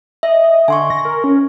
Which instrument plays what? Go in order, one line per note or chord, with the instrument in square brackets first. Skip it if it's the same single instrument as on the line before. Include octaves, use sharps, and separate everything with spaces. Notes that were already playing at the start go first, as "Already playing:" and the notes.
[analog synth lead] D#5 [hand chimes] E5
[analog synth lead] D3 [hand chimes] G#5 C6 C#6
[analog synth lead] A#6
A#4
C#4